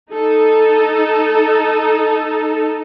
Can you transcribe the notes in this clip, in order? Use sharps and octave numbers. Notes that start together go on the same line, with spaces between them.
D#4 A4